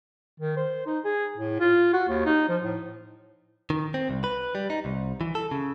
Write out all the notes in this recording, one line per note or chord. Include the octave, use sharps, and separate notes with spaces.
D#3
C5
D#4
G#4
A2
F4
F#4
D#2
D#4
F3
A2
D#3
C4
C2
B4
G3
D#4
C2
E3
A4
C#3